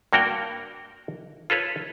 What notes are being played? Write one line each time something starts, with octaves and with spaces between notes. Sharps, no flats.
G2 A#3 F#4 A#4 G5
F4 A4 B4 C#5